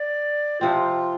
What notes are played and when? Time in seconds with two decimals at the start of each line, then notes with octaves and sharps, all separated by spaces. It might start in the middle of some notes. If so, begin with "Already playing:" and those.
Already playing: D5
0.61 C3 F3 C4 F4